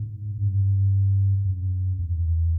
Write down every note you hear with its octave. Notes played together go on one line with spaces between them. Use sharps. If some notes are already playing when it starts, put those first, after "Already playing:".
Already playing: G#2
G2
F#2
E2